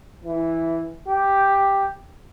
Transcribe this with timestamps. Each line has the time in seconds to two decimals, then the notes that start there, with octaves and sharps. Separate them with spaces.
0.25 E3
1.08 G4